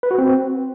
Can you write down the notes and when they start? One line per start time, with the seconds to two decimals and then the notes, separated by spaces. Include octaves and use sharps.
0.03 B4
0.11 F#4
0.18 C4